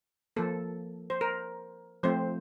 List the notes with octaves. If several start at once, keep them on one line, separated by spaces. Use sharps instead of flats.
F3 A#3 A4
C5
A#4
F3 A3 C4 C5